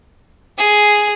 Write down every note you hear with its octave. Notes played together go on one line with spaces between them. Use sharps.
G#4